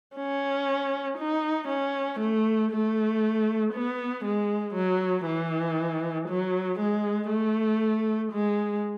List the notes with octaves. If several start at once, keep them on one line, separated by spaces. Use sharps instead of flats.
C#4
D#4
C#4
A3
A3
B3
G#3
F#3
E3
F#3
G#3
A3
G#3